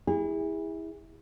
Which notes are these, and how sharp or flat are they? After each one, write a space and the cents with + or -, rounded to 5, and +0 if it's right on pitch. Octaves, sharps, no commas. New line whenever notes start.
E4 -20 G#4 -35